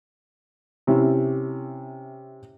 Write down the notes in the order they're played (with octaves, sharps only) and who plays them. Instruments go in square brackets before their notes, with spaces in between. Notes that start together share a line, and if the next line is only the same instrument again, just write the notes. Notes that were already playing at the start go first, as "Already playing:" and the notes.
[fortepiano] C3 C#4 E4 G4